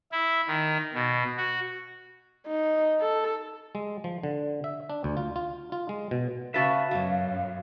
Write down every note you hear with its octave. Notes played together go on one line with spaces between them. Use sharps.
E4
D#3
B2
F#4
D#4
A4
G#3
F3
D3
E5
D4
D2
F4
F4
F4
G#3
B2
C#3 F#4 B4 E5 F5 A5
F#2 B2 F#3